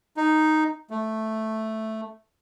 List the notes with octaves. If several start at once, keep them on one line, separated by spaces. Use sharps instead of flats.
D#4
A3